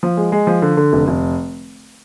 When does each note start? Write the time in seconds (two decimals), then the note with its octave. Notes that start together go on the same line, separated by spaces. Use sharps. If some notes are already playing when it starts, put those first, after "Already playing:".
0.03 F3
0.17 G#3
0.32 G#3
0.47 F3
0.62 D3
0.77 D3
0.93 F1
1.08 F1